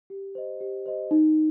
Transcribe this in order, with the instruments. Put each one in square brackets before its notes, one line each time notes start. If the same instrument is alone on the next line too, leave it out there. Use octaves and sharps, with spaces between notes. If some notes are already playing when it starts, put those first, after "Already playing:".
[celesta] G4
C5 D#5
G4
C5 D#5
D#4